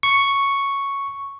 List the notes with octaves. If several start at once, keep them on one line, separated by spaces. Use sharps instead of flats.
C#6